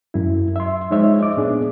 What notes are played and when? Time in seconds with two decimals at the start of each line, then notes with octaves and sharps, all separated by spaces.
0.14 F#2 E4
0.56 E5 C6
0.91 F3 G#3 D#4 C5 C#5 E5
1.20 D#5 D6
1.37 A#2 B3 D4 G#4